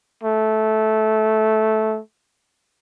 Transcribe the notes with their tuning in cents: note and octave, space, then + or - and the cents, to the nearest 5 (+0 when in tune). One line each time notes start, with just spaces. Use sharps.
A3 -15